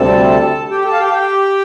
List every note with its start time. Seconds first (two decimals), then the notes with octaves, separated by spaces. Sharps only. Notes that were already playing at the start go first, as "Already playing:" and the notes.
Already playing: D2 C3 G3 C4 A4 A5
0.71 G4 G5
0.81 G5
0.85 A4 A5
0.92 F5
0.99 G4 G5
1.09 F5
1.13 G4 G5